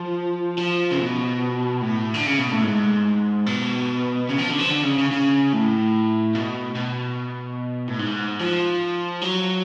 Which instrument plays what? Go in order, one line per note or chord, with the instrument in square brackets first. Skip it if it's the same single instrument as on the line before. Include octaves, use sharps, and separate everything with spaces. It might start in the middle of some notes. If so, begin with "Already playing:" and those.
Already playing: [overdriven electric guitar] F3
F3
C#3
B2
A2
D3
C#3
B2
A2
G#2
B2
C#3
F3
D3
F3
D3
C#3
C#3
C#3
A2
B2
B2
A2
G#2
F3
F#3